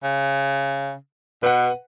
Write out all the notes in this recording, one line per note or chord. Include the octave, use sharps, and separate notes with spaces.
C#3
B2 B4 F#5